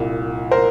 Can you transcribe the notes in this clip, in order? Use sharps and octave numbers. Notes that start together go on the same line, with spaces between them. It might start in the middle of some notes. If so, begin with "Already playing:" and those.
Already playing: C2 A#2
A#4 C5